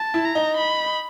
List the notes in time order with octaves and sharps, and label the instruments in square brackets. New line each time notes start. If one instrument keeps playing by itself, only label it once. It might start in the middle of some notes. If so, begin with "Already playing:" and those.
Already playing: [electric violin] A5
[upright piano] E4
[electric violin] A#5
[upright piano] D#4
[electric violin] B5